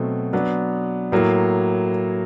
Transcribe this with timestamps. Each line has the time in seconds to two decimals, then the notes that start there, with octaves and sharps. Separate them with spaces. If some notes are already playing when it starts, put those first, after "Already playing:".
Already playing: B2 F#3 A3 C4
0.33 F#3 B3 D4
1.12 A2 F#3 A#3